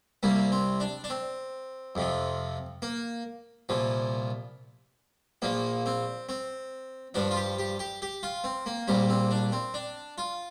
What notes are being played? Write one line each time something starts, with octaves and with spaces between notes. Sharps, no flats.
C2 C3 G3 A#3
C4
D4
D4
C4
F2 C3 F3
A#3
C2 A#2 F3
A#1 A#2 F3 A#3
C4
C4
G2 F3 D4
F4
G4
G4
G4
G4
F4
C4
A#3
A#1 A#2 G3 C4
C4
D4
C4
D4
F4